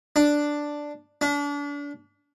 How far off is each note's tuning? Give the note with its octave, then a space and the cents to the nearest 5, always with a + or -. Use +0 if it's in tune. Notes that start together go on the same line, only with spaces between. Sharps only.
D4 +0
D4 -35